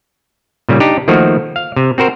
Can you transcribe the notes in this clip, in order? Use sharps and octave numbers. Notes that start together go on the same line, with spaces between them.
A#2 C#3 G3
D4 D#4 G4
D#3 F3 A3 A#3 F#4
F5
C3
C4 F#4 A#4 C5